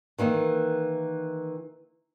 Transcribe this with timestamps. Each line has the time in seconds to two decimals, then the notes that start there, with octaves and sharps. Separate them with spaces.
0.18 D#3 E3 A#3 D#4